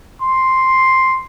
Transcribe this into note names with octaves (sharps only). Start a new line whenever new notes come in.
C6